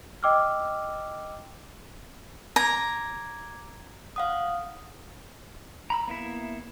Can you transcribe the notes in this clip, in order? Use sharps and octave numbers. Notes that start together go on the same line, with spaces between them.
D#5 G5 D6 E6 F6
A#5 D6 G#6
F5 F#5 D#6
A#5 B5 E6
A#3 B3 E4 E5